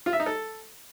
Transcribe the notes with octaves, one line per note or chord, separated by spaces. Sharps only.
F4
E5
D#4
A4